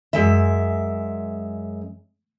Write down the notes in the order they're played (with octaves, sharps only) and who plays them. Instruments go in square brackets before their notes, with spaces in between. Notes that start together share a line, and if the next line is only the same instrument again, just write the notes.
[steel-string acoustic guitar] F#2 G#3 E5